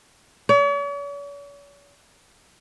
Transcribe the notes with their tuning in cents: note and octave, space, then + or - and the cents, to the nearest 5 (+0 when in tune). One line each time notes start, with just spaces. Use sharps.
C#5 +45